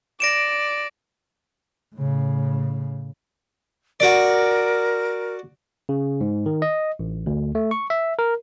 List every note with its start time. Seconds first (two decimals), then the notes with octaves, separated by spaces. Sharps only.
0.20 D5 A#6 D7 E7
1.96 A2 C#3
4.00 F#4 A#4 D5
5.89 C#3
6.21 G#2
6.46 D#3
6.62 D#5
6.99 A1
7.26 D2
7.55 A3
7.71 C#6
7.90 E5
8.19 A#4